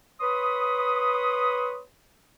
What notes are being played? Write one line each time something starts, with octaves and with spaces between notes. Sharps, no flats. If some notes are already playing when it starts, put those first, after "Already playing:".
B4 C#5 B5 C6 D#6